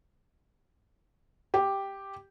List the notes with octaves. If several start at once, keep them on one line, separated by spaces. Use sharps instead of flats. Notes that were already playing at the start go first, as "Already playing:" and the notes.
G4